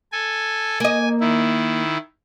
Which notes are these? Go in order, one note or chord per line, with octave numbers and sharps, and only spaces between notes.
A4 G#5
A#3 D#5 G#5
D#3 E4